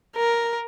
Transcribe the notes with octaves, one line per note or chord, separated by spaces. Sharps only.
A#4